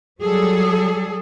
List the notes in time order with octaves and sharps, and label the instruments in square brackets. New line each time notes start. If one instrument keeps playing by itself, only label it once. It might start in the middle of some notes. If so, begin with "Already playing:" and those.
[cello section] F#3 G3 G#4 A4